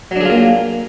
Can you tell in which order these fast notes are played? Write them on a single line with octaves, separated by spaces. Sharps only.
F#3 D4 G#4 F4 A#3